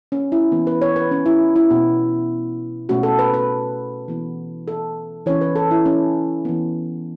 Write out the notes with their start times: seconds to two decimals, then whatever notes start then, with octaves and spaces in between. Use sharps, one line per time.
0.12 C#4
0.32 E4
0.52 E3 B3
0.67 B4
0.82 C#5
0.96 B4
1.11 C#4
1.26 E4
1.56 E4
1.70 B2 B3
2.89 B2 A3 C#4 F#4
3.03 A4
3.19 B4
3.34 B4
4.08 E3 B3
4.68 A4
5.26 E3 C#4 C#5
5.41 B4
5.56 A4
5.71 E4
5.86 C#4
6.45 E3 B3